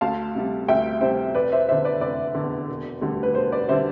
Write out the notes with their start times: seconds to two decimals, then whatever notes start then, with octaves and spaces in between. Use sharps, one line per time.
0.01 D2 F5 A5
0.35 C3 G3
0.68 D2 E5 G5
1.01 C3 G3 C5 E5
1.34 F1 B4 D5
1.52 C5 E5
1.69 E2 D3 C5 E5
1.84 B4 D5
2.01 F1 B4 D5
2.35 D3
2.40 E2
2.68 E1
3.02 D2 D3 G3
3.23 B4
3.35 E1 C5
3.52 B4 D5
3.69 D3 G3 C5 E5